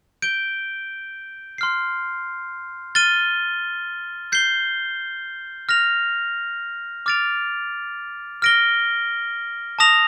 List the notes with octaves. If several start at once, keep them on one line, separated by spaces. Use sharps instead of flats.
G6 D7 G7
C6 F6 C7
F6 A6 D#7 G7
G6 C7 G7
F6 A#6 F7
D6 F6 A6 D7 F7
F6 A#6 D7 G7
A5 D#6 A#6 F7